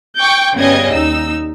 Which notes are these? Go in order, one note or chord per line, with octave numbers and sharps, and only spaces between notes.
G5 C#6 D6 G6
G1 C#3 G3 B3 D#5 G#6
D#2 D#4 E6